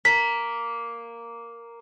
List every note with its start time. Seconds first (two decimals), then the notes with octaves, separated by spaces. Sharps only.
0.05 A#3 B6